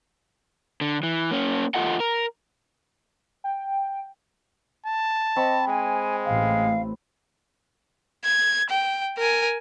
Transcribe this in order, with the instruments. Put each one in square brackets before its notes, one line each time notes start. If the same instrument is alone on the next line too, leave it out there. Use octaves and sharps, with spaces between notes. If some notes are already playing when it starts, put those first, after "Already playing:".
[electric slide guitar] D3
E3
A#3 C#4
E2 F4 A4 D#5 F#5
A#4
[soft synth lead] G5
[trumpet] A5
[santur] C4 B5 C#6 [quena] D#5
[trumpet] G#3 [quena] G#5
[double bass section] A1 A2 [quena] F5
[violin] G#6
G5
A#4 G#5